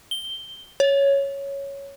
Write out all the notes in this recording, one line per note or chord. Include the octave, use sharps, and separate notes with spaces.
G7
C#5